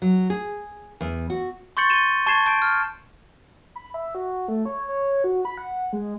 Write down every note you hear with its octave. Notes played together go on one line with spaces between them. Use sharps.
F#3
G#4
E2
F#4
C6 C#6 G6 A6 C#7 F#7
A6 C#7 D#7 E7 G7
A5 C#6 G#6 A6 C7 E7
A5 G6 D7
F6
B5
E5
F#4
A3
C#5
C#5
F#4
B5
F#5
G#3